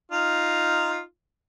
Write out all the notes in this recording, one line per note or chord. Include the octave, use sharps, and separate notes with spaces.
D#4 F4